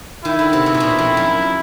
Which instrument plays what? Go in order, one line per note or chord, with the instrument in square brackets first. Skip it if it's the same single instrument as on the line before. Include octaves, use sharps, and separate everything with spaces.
[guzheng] D#3 [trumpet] E4
[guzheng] D3
C3
B2
A#2
B2
F2
F#2